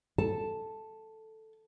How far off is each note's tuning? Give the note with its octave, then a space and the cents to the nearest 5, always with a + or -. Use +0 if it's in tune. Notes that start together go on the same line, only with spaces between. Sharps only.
A4 +0 A5 +0